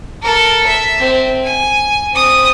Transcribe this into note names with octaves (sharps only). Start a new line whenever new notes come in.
A4 A#4
E5
C4
G#5
C4 D#6